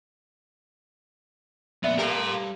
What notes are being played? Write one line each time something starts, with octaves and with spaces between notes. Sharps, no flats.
F2 A#2 B3 D5 E5
G3 A#3 G4 A4 A#4 F5 C6